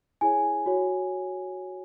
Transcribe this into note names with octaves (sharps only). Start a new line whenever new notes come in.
E4 G#4 C#5 G#5
F#4 C#5